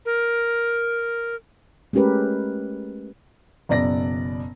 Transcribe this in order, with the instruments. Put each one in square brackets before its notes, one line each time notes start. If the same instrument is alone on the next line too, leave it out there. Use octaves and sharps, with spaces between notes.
[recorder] A#4
[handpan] G#3 A3 C#4 G4 A#4 B4
[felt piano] F#1 B2 D5 A#6